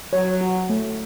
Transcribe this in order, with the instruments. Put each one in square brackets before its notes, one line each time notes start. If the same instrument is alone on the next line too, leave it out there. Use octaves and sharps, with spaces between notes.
[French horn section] F#3 [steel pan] C#5
[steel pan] F#4
A3